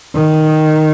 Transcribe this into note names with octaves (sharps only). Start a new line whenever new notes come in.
D#3